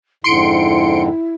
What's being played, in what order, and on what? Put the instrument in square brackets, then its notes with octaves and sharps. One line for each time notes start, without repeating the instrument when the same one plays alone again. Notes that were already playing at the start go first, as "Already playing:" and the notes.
[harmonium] F2 G#2 D3 [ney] E4 [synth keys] C6 C#7 D7